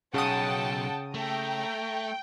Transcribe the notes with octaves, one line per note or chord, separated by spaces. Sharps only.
B1 C#3 F#5 G5 A5 D#6
A3 G5 A#5